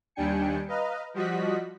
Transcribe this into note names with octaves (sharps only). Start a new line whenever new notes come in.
D#2 G3 D4 G5 G#5 C#7
B4 D#5 F5 A#5
F3 G3 F#4 D#5 F#6 B6